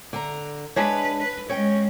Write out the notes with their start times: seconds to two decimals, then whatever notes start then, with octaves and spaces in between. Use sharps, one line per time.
0.13 D3 A#5
0.76 G#3 D4 B4 C#5
1.20 B4
1.49 G#3 C#4 C#5 G5